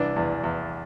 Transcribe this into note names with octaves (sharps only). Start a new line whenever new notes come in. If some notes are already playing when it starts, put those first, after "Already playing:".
Already playing: C2 E3 D4
E2
E2